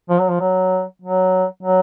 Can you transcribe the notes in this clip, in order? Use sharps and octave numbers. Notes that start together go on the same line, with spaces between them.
F3
F#3
F3
F#3
F#3
F#3